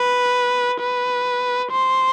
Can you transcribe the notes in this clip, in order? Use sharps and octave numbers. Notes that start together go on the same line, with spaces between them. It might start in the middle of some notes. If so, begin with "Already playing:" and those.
Already playing: B4
B4
C5